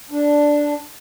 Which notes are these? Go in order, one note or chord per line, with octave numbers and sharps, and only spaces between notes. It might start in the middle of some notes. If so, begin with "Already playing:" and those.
D4